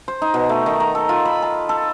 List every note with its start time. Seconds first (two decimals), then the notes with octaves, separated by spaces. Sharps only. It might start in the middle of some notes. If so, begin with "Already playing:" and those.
0.08 C5
0.22 D#4
0.34 B2
0.49 A3
0.66 D#3
0.80 A#5
0.95 A4
1.09 F4
1.25 B5
1.42 A5
1.69 A4